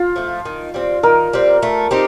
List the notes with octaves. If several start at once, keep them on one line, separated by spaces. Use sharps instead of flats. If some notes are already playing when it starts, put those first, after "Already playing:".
Already playing: F4
F3 A3
D#3
G3 C4
D#3 A#4
G3 C4
A3
C4 D#4 G4